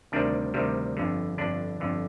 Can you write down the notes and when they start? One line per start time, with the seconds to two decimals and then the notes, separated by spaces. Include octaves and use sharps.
0.12 D2 C3 D#3 G3 D4
0.54 D2 C3 D#3 G3
0.97 G1 F2 D3
1.38 G1 F2 D3 D4
1.80 G1 F2 D3